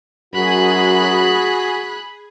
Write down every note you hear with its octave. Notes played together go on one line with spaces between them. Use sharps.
F#2 F#4 G#4 B5 F#6